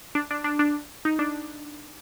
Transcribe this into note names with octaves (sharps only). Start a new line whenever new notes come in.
D4
D4
D4
D4
D#4
D4